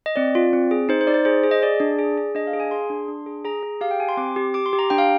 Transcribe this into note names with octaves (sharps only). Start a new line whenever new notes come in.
D#5
C4 D5
F4
C4
G#4
D#4 C5
C5
D#4 D5
C5
G#4 C5
G#4
D#5
G#4 D5
D4
G#4
G#4
D4 D#5
F5
G#4
G#5
G#4 C6
D4
D4
G#4
G#4 A#5
G#4
G4 F5
G5
G4 G#5
C6
C4 D6
G4
G4 D6
C6
G4
A#5
D4 G5
F5